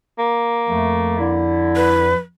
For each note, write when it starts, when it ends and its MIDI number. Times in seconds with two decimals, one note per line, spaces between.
0.19 1.52 58
0.69 2.14 41
0.69 1.17 57
1.18 2.12 50
1.18 2.12 64
1.76 2.16 71